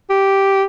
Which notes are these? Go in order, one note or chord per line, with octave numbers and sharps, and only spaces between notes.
G4